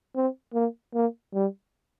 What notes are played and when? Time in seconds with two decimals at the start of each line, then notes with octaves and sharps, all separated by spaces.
0.16 C4
0.54 A#3
0.94 A#3
1.34 G3